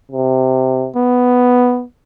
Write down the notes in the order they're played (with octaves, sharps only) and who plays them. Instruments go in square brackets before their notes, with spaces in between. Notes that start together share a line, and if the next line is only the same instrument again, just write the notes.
[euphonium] C3
[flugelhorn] B3